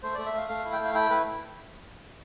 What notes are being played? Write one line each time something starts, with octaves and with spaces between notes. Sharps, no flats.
A3 C5
A3 D5
E5
A3 F5
A3 F5
E4
G5
A3 F5
E4 G5
A3 B4